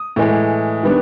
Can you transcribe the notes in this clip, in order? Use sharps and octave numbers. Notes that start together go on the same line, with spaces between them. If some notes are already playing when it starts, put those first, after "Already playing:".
Already playing: D#6
A2 E3 G#3
D#3 G3 B3 D4